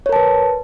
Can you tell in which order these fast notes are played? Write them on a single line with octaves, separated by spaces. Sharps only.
C#5 A#4 A5 B4